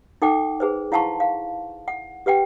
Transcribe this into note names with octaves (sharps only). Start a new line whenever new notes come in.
D#4 A4 F#5 G5 D6
G#4 B4 C5
E4 F5 F#5 A5 C6 C#6
F5
F#5
G4 B4 F#5 G5